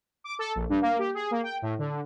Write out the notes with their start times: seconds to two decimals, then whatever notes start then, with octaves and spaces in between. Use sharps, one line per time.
0.24 D6
0.39 A4
0.55 A#1
0.69 G2
0.82 A#3
0.99 G4
1.14 G#4
1.31 A#3
1.43 G5
1.62 A2
1.79 D3